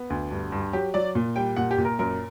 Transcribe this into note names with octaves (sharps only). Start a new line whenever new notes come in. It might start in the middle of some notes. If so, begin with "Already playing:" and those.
Already playing: B3
D2
G2
G2
F#3 G4
F#3 D5
A#2
G3 G5
A#2 F#5
G4
A#2
A#4
F#2 A#4